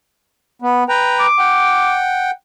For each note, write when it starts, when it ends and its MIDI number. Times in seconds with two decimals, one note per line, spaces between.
0.62 0.84 59
0.89 1.27 71
0.89 1.27 79
0.89 1.27 82
1.20 1.94 86
1.39 2.31 78
1.39 2.31 79